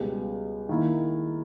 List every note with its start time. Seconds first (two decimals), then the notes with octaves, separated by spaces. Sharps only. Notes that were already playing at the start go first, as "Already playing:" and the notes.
Already playing: C#2 B2 G3 B3 G4
0.69 D#3 A#3 E4